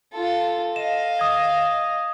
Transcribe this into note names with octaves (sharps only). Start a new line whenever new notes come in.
F4 A4
D#5 F5 E7
D#6 G#6